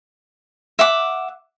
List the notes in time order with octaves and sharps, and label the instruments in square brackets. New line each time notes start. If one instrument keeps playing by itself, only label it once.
[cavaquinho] E5 F#5 D6